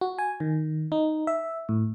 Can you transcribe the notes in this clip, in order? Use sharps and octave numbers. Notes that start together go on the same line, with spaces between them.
F#4
G#5
D#3
D#4
E5
A2